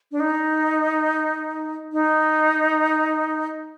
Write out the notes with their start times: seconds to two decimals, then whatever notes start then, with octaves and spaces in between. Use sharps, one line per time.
0.12 D4
0.20 D#4
1.92 D#4